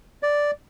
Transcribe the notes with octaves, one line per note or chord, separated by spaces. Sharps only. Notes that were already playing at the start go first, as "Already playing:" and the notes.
D5